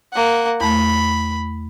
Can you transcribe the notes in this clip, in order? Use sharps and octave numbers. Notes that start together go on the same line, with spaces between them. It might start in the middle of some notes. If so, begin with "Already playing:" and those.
A#3 F#5
E2 A3 B5